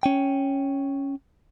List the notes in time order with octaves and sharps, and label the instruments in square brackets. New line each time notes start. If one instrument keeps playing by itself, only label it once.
[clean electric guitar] C#4 G5